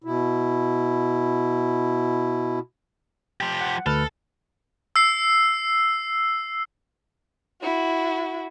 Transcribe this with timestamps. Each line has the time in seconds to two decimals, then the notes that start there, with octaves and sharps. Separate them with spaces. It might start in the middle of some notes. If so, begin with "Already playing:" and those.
0.04 B2 E4
3.41 F3 G4
3.61 F#5
3.86 D2 A4 B4 F6
4.96 E6 C7
7.61 E4 F#4